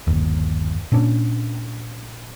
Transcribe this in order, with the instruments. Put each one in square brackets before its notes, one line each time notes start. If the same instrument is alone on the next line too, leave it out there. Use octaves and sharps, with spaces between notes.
[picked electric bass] G1 D#2
A#2 C#4 D4